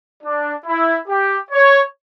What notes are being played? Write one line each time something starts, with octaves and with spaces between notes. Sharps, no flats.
D4
E4
G4
C#5